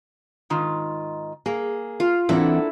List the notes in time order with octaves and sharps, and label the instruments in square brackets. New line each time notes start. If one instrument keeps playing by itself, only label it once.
[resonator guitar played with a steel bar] G#2 D#3 F4
[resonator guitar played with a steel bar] A#3 [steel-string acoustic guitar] G#4
[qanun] F4
[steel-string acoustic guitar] E3 C4 F#5 [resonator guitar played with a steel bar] A#3 D4 A4 [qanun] E4